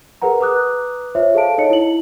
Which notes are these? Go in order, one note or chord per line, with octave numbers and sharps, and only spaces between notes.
G#4 A#4 B4 F#5 A#5
B4 A#5 D6 D#6 F#6
F4 C5 C#5 E5
G#4 A4 C5 F5 A5 D7
D#4 C#5 D#5 C#7
E4 F#7